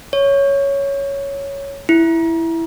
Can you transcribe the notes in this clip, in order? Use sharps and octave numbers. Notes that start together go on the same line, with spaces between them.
C#5
E4